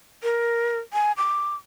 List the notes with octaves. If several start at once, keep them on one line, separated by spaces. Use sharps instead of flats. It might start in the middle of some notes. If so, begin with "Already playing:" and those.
A#4
G#5
D6